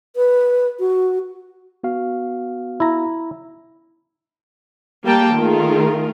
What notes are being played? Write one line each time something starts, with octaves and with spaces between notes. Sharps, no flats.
B4
F#4
B3 F#4 F5
E4 A#5
G3 A#3 G5 A5
D#3 A3 F4 G#4 A#4